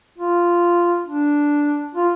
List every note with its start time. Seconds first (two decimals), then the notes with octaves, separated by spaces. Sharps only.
0.18 F4
1.07 D4
1.95 F4